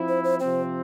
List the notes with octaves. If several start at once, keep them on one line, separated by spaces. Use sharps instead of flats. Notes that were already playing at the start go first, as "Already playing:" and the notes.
Already playing: F3 C4 E4
C5
C5
C3 F3 C4 C5